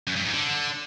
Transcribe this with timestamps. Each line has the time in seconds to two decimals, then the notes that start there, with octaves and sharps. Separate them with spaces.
0.07 F#2
0.16 G2
0.25 G#2
0.34 D3